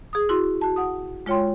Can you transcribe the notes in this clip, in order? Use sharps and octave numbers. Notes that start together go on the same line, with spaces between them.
G#4 D#6
E4 F#4 C6
F#4 A5
F#5 D#6
G#3 F4 C#5 G5 C6